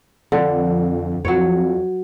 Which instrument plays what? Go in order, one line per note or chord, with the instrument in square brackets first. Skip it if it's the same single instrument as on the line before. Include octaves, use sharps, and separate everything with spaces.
[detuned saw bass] F2 [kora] D3
[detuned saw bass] F2 [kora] F#3 C#5